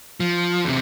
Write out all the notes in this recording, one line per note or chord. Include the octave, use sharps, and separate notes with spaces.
F3
E2 C3